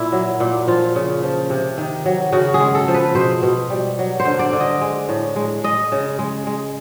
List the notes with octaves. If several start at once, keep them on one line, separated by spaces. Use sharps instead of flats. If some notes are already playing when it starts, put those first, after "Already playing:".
Already playing: A#2 E4
F#3
A#2
F3 F4
C#3
F3
C3
D#3
F#3
C#3 F#4
G#4
G#3
A4
F3
B4
B2 C5
B2
G3
F#3
C5
D3
D5
D3
D#5
G#3
A2
G#3
G#3 D#5
C#3
G#3
G#3